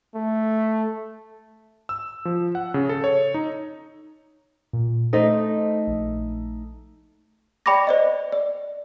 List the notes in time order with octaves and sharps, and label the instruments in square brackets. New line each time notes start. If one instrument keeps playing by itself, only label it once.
[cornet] A3
[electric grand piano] E6
F3
F#5
C#3
A4
C#5
D#4
[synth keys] A#2
[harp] A3 D#4 [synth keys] A4 C5 D#5
[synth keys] A#1
[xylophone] D5 G5 B5 C#6 D6 A#6
C5 D5 D#5
D5